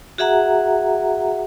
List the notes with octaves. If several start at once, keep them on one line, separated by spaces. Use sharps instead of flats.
F#4 G#4 E5 F#5 A#5